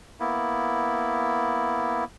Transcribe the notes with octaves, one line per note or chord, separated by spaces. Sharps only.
A#3 B3 E4